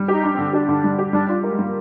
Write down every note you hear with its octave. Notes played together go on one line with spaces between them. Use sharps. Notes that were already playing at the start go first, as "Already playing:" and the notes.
Already playing: G3
D#4 G4
D4
D3 C4
D4 G4
D3
G3
G4
G3 D4
D4 F4
G#3 A#4
G3 A#3